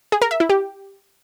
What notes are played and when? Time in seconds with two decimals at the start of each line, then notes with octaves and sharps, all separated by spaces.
0.12 G#4
0.22 A#4
0.31 E5
0.40 E4
0.49 G4